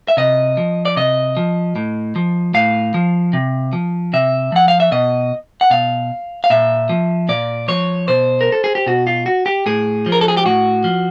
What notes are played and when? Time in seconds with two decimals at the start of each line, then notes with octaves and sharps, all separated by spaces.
0.08 E5
0.17 C3 D#5
0.57 F3
0.85 D5
0.96 C3 D#5
1.37 F3
1.76 A2
2.16 F3
2.54 A2 F5
2.94 F3
3.33 C3
3.73 F3
4.13 C3 E5
4.52 F3 F#5
4.68 F5
4.80 E5
4.92 B2 D#5
5.61 F#5
5.70 B2 F5
6.44 F5
6.50 A#2 E5
6.89 F3
7.29 A#2 D5
7.68 F3 C#5
8.08 B2 C5
8.41 A#4
8.52 A4
8.64 G#4
8.75 G4
8.86 B2 F#4
9.07 F4
9.26 F#4
9.46 G4
9.66 A2 G#4
10.06 F3
10.12 A#4
10.21 A4
10.28 G#4
10.37 G4
10.46 A2 F#4
10.84 F3